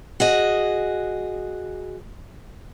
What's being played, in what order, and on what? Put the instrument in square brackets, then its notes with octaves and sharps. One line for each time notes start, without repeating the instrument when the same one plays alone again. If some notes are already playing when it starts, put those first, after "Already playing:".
[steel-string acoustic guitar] F#4 G#4 D#5